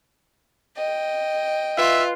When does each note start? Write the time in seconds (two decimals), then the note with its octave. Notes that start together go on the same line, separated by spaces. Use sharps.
0.77 D#5 G5
1.77 F4 B4 E5 F5